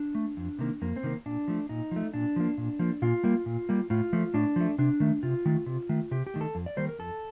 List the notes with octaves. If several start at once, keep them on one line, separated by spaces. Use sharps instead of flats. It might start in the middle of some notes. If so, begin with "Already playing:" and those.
Already playing: D4
A3
F2
C3 D#3 A#3
F2 A#3
C4
C3 D#3 A#3
A#2 D4
F3 A3
A#2 D#4
F3 A3
A#2 D4
F3 A#3
A#2
F3 A#3
A#2 F4
G3 A#3
A#2
G3 A#3
A2 F4
F3 A3
A2 D4
F3 A3
C3 D4
D#3 A3
C3 F4
D#3 A3
C3
D#3 A3
C3 G4
G4
D#3 A3
A4
F2
D5
D#3 G3 A#3 C5
A#4
F2 A4